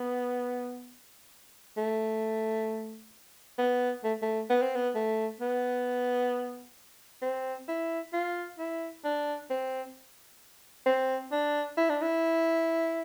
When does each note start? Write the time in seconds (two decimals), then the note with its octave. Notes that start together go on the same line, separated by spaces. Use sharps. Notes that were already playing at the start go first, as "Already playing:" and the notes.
Already playing: B3
1.77 A3
3.58 B3
4.04 A3
4.22 A3
4.50 B3
4.63 C4
4.76 B3
4.95 A3
5.41 B3
7.22 C4
7.68 E4
8.13 F4
8.59 E4
9.04 D4
9.50 C4
10.86 C4
11.32 D4
11.77 E4
11.90 D4
12.02 E4